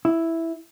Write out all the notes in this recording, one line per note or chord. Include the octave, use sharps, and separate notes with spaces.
E4